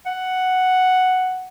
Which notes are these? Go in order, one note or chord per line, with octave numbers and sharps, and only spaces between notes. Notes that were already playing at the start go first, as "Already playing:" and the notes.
F#5